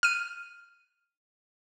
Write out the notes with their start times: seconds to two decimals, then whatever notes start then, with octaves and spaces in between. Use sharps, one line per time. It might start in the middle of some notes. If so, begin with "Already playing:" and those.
0.03 F6 D#7